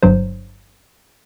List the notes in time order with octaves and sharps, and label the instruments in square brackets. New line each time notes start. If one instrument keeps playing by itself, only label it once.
[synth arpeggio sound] G1 G2 F#3 C5